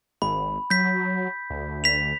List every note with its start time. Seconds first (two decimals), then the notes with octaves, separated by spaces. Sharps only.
0.22 G#1 B5
0.70 F#3 G6 B6
1.50 D2
1.84 B6 F7